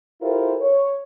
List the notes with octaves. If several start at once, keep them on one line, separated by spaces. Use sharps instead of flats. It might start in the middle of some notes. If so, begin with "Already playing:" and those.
E4 F4 G4 A4 A#4 C5
C#5